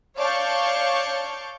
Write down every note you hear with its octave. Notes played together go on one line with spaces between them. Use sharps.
C#5 D5 F5 A5 C#6 G6